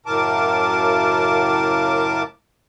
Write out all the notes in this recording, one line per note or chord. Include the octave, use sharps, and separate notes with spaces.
F#2 A2 C#3 A#4 A5 D6